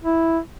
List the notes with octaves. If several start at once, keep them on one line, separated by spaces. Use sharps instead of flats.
E4